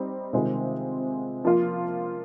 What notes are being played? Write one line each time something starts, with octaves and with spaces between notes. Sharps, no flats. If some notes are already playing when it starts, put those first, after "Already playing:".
Already playing: G3 C4 D#4
C3 D#3 G#3 C4 F4
F3 A#3 F4